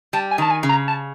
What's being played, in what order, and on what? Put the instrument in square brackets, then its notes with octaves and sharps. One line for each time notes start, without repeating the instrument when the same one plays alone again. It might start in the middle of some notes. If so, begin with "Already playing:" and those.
[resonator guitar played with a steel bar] G3 [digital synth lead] A5
[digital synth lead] G#5
[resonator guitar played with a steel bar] D#3 [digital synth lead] A5
[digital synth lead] G#5
[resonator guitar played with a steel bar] C#3
[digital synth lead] A#5
A5